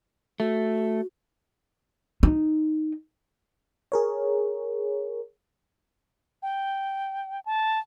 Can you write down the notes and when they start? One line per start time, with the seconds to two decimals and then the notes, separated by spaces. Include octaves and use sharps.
0.40 A3 F#4
2.23 D#4
3.92 G#4 A#4 C#5
6.43 G5
7.46 A5